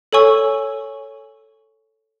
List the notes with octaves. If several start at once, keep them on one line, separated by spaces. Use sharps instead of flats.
A4 C#5 G#5 C#6 E6